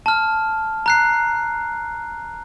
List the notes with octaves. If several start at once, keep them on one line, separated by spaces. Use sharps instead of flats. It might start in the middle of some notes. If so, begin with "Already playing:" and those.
A5 F6
A#5 F#6 C7